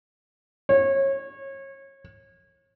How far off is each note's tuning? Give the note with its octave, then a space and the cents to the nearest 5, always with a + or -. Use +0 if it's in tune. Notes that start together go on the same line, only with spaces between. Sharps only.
C#5 -30